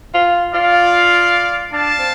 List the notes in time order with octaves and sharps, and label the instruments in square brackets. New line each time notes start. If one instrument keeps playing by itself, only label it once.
[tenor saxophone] F4
[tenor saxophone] F4 [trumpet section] D5 F5
[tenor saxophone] D4 [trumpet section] F5 A5
[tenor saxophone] C4